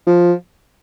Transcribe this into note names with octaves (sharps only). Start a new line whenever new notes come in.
F3